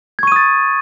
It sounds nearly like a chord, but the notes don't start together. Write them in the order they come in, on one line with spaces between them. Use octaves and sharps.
G#6 C#6 D#7 D#6 A6